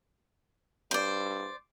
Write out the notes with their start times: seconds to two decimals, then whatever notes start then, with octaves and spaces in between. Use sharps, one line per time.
0.91 G2 C5 D5